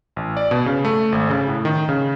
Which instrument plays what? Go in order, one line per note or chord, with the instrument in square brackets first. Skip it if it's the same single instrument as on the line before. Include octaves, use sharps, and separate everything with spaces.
[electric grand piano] A1
D5
B2
C#3
A3
G#1
C#3
A2
D#3
C#3